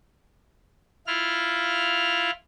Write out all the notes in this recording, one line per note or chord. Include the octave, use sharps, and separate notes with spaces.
E4 F4 F6